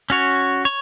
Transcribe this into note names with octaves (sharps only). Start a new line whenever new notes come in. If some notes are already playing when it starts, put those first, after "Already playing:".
C#4 F#4 C#5
C#5